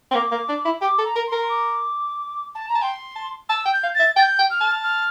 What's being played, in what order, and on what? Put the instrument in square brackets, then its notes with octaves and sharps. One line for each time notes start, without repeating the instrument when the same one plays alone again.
[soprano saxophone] C4
[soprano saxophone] A#3 [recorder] D6
[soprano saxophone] A#3
D4
E4
[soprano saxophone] G4 [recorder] D6
[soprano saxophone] A4
[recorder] A#5
[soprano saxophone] A#4
[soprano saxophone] A#4 [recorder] C6
[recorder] D6
A5
A#5
[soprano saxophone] A5
[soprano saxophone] G5 [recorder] C6
[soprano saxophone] A5
[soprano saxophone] A5 [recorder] E6
[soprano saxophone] G5
[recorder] G6
[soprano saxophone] F5
[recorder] A6
[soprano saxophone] E5
[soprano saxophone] G5 [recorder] A6
[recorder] G6
[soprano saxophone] G5
[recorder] F6
[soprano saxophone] A5
[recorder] F6